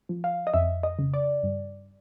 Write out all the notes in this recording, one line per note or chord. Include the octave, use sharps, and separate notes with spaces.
F3
F5
D#5
F2 E5
D#5
C#3
D5
G2